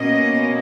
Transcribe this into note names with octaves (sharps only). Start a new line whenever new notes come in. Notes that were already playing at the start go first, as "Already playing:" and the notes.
Already playing: B2 A#3 C#4 D#5